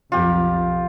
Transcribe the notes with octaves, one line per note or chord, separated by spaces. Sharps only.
B1 F2 F4 G4